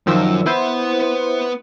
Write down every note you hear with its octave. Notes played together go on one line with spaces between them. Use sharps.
F#2 D#3 F3 E6
B3 E4 B4 C5